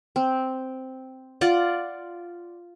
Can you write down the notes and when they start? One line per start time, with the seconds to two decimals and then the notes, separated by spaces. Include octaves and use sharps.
0.16 C4
1.41 F4 D5 F#5